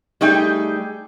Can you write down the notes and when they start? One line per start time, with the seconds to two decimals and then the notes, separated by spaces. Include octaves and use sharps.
0.21 G3 A3 D#4 G#4 G5